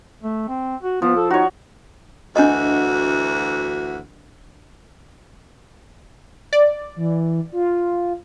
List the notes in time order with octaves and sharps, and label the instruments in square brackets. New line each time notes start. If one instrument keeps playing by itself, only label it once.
[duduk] A3
C4
F#4
[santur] F3 [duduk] B3
[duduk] A4
[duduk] D#4 [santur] F#4 C#5
[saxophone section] D2 E3 F#4 [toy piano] D4 D#5
[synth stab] D5
[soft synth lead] E3
F4